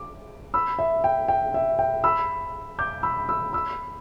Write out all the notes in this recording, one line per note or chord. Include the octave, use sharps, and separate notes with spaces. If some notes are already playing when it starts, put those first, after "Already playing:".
Already playing: D6
B5 E6
E5
G5
G5
E5
G5
B5 E6
D6 G6
B5 E6
B5 E6
B5 E6